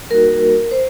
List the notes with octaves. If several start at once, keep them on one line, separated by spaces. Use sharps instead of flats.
G3 A#3 D#4 F#4 A#4
C5